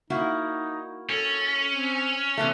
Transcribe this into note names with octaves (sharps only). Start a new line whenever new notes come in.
A#3 D#4 E4 F#4
C#4 A4
C4
C3 E3 A3 A#3